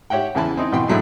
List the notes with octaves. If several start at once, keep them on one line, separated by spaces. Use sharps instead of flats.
G4 C#5 E5 F#5 G5
E2 C#3 E3 G#5 A5 B5
C4 D#4 E4
F2 B2 E3 G5 C6
A2 D3 F#3 G#3 A3 C6